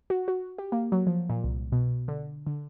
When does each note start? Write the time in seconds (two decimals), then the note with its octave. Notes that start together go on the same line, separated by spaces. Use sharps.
0.10 F#4
0.28 F#4
0.58 G4
0.72 A#3
0.92 F#3
1.07 F3
1.30 A#2
1.44 C2
1.72 B2
2.08 D3
2.47 D3